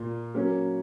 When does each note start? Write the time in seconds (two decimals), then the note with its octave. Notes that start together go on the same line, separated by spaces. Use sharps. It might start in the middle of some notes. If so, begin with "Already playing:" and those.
Already playing: A#2 A#3
0.34 F#3 A#3 C#4